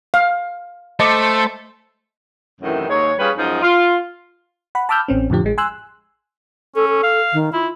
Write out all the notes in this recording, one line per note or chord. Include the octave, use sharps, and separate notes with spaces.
F5
A3 C5 D#5 A5 D6
F#2 A2 C3 D#3 E3
D#2 G#2 G#3 C#5
G3 C#4 F4 G#4 B4 C#5
F#2 F3 G#3 D#4
F4
F#5 B5
A5 B5 D6 E6 F6 G6
A1 C4 C#4
F2 A2 D3 F3 G4
A1 G#3
G#5 C6 E6 F#6
C#4 A4
A4
F5
D#3
E4 F4